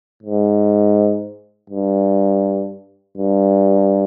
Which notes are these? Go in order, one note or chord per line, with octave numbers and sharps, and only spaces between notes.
G#2
G2
G2